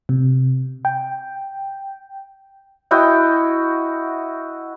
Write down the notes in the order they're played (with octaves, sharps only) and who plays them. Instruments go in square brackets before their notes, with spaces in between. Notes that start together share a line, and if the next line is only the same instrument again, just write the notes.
[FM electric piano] C3
G5
[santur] E4 F#4 D#5 G5